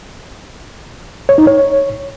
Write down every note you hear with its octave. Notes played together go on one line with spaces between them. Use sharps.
C#5
D#4
C#5